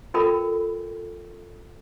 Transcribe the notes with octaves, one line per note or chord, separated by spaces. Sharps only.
F4 A4 A#4 G5 B5